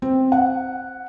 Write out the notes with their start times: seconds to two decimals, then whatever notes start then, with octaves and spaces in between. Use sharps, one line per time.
0.02 C4
0.32 F#5